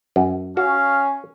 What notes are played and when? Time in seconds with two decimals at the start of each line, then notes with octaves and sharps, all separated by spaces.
0.16 F#2
0.57 C#4 F#4 F5